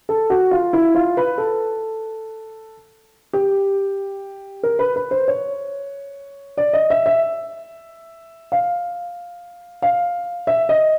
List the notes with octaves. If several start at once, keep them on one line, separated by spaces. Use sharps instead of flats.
A4
F#4
F4
E4
F4
B4
A4
G4
A#4
B4
B4
C5
C#5
D5
D#5
E5
E5
F5
F5
E5
D#5